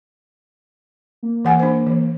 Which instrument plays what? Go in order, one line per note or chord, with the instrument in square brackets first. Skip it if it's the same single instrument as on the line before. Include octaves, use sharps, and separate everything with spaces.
[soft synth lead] A#3
[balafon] E3 F#5 G#5
D4 C5
E3